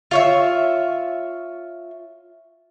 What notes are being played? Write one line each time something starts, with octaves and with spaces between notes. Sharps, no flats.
F4 C#5 E5